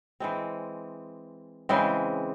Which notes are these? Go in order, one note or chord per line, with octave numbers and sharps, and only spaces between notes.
E3 G#3 C4
C#3 E3 G#3 C4